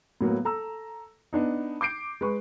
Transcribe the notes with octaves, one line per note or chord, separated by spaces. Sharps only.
A2 F#3 A#3 B3
A4 A#5 E6
B3 D4 D#4
D6 G6 C7 D7
G#3 B4 C#6